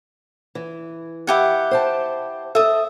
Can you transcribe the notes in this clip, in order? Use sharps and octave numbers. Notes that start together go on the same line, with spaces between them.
E3
E4 G4 F#5
C5 G5 A5
A4 D#5 E5 D#6